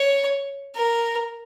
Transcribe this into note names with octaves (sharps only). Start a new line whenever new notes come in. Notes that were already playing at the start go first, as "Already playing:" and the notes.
Already playing: C#5
A#4